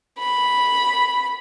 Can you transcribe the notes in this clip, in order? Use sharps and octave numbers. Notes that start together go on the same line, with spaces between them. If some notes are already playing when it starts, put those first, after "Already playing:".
B5